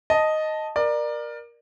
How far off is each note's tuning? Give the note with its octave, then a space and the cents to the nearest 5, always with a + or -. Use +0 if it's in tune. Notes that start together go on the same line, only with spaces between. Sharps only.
D#5 +0 A5 +0
A#4 +15 D5 +25